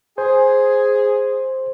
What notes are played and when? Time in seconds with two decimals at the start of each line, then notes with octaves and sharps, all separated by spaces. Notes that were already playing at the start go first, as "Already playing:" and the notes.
0.18 G#4 C5